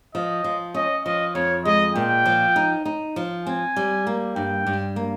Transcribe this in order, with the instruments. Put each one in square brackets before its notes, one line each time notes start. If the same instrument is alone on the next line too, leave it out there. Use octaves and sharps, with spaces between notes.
[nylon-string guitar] F3 [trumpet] D#5
[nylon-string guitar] F3
[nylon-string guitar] C#4 [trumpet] D#5
[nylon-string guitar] F3 [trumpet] D#5
[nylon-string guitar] F2 [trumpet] C#5
[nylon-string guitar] G#3 [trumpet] D#5
[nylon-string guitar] A#2 [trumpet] G5
[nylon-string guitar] F3
D#4
D#4
F3
[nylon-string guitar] C4 [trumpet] G#5
[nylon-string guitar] G3
A#3
[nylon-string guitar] G2 [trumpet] G5
[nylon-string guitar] G2
A#3